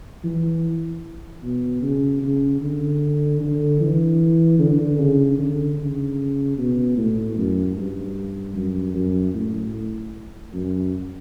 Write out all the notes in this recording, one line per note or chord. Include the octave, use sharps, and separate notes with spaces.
E3
B2
C#3
C#3
D3
D3
E3
D3
C#3
D3
C#3
B2
A2
F#2
G2
F#2
F#2
A2
F#2